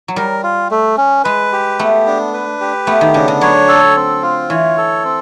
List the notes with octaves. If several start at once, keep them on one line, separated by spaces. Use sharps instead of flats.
F#3
G3 A#4
F4
A3
C#4
G#3 B4
G4
A3 B3
D4
B4
G4
A3 B3
D#3
C#3 D4
D3
F#3 C#5
A4
C4
F4
E3 C#5
A4
C4